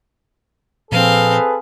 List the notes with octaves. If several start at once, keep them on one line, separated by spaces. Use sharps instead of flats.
A#2 F3 C4 G#4 A4 B4 F5